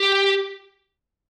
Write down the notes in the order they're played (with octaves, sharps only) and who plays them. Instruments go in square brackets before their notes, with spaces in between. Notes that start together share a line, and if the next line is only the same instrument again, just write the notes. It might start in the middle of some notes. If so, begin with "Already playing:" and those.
Already playing: [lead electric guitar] G4